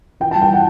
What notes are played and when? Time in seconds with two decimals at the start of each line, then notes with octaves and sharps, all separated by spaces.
0.20 E3 G5
0.31 G3 A5
0.42 G5
0.49 E3 F#5